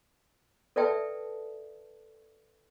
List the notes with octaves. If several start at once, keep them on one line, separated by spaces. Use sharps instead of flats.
A4 B4 D5 E5 G5 A5